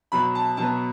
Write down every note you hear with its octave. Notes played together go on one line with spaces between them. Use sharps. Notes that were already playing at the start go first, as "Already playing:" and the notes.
B2 F#3 B3 B5
A5
B2 F#3 B3 A5